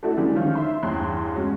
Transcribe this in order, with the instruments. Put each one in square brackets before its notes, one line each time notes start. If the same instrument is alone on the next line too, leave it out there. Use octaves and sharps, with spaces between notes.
[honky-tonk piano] A3 D4 E4 F#4 A4
D3 E3 G3 G#3 D4
D#3 F3 C#4 F4
E5 C6
E2 G2 C#5 G5 C6 F#6
G#3 C#4 F#4